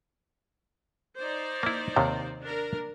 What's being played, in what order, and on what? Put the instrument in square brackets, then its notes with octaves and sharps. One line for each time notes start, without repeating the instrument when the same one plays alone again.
[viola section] D#4 C5 D5
[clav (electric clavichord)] A#3 E4
D#2 C3 D#3
[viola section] D4 A#4